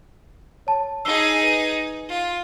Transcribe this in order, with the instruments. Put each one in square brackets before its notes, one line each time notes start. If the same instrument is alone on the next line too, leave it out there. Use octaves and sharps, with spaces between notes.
[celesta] C#5 A5
[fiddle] D#4 G#4 [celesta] E6 C7 G7
[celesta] B4 G#5
[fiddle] F4